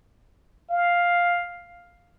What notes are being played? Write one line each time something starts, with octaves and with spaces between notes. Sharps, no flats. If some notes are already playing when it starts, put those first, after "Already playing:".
F5